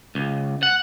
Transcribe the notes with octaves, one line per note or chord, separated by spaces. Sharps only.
C#2
F#5